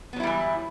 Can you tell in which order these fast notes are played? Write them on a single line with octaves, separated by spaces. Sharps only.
B3 F#3 E4 G3 E3